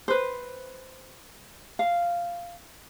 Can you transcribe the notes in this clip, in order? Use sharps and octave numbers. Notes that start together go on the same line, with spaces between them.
B4 C5
F5